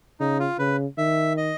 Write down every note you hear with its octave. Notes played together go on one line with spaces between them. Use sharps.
C#3 D#4
F4
C#3 B4
D#3 E5
D#5